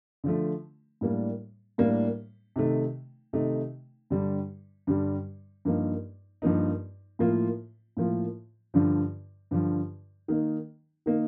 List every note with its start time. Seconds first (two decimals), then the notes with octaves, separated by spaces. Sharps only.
0.24 D3 F3 A3
1.01 A2 G3 A#3 D4
1.78 A2 G3 A#3 D4
2.56 C3 D#3 A3 D#4
3.33 C3 D#3 A3 D#4
4.10 G2 D3 G3
4.87 G2 D3 G3
5.65 G2 F3 A#3 D#4
6.42 G2 F3 A#3 D#4
7.19 A2 F3 A#3 F4
7.97 A2 F3 A#3 F4
8.74 G2 D3 F3
9.51 G2 D3 F3
10.28 D#3 A#3 D#4
11.06 D#3 A#3 D#4